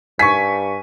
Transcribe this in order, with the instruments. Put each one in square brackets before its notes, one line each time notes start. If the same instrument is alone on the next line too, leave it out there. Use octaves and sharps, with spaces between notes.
[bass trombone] G2 [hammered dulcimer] G#5 [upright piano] C#6 B6